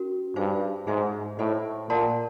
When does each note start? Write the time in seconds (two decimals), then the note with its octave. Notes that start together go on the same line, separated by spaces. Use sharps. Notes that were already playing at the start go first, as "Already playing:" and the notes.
Already playing: C#4 F#4 A#4
0.36 G2 D#4 G#4 C5 F5
0.87 G#2 D#4 G#4 C5 E5
1.38 A2 A4 C5 D#5
1.89 A#2 A#4 D5 F#5 A5 C6